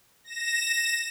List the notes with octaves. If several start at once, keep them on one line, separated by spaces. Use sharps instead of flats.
A#6 E7